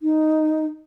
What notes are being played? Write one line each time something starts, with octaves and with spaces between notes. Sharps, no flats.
D#4